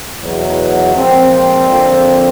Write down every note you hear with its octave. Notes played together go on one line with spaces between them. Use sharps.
E2 B2 F#3
A#2 F3 G#3 C4
F2 D3 F3 A#3